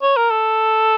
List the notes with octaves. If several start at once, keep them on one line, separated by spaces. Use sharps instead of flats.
C#5
A#4
A4